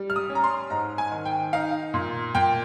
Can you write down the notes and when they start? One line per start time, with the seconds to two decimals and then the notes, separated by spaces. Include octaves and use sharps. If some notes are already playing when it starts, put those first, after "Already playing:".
Already playing: G3
0.10 F6
0.16 D#6
0.30 C#4
0.35 A#5
0.44 C6
0.70 G#2 A#5
0.98 G#5
1.11 D#3
1.26 G5
1.53 D#4 F5
1.94 A#2
2.35 A#2 G5